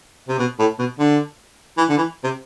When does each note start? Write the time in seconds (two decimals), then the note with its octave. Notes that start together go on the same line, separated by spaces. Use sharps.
0.29 C3
0.39 B2
0.59 A2
0.79 B2
0.99 D3
1.77 E3
1.89 D3
1.97 E3
2.24 C3